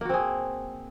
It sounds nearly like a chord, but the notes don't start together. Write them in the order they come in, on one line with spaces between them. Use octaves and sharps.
A#3 F#4 C4 G#4